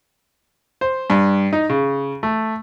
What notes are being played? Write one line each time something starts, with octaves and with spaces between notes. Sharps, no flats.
C5
G2
D#4
C#3
A3